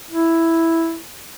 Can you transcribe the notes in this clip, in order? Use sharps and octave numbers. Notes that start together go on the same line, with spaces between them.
E4